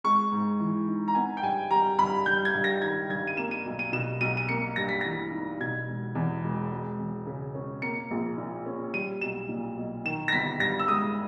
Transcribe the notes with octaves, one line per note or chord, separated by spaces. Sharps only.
G#3 C#6
G#2
E3
D#4
A#5
B3 G#5
G5
G2 G#5
G3 A#5
G2 B5
G3 G6
G#6
G2
A#6
D#3 G#6
G2 G#6
D#7
A#3 E7
D#7
B1
D#7
B2 E7
B1 D#7
D#7
A#3 C#7
G2 A#6
B6
E3 A#6
D#4
B2 G#6
E1
E2
E1
G#3
E2
C#3
C#4
A#3 C#7
A#1
A#2
C#4
G3 D#7
B1 E7
A#2
B1
D#3 E7
A#6
G1 B6
G2 A#6
E6
G#3 D#6